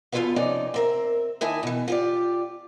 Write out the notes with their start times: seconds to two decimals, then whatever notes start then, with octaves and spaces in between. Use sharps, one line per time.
0.12 E2 B2 F4 A4 B4 F5
0.36 F2 C3 C#4 D#4 D5
0.74 C4 A#4 E5
1.41 D#2 D#4 E4 E5 G#5 A5
1.63 B2 E3
1.88 F4 G4 D5